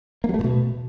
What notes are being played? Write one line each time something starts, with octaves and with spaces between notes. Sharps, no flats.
A#3
F#3
A3
A2
B2